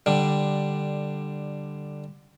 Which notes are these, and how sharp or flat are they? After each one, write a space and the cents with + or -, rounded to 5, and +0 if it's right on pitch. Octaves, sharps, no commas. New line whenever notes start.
D3 +10 G3 +0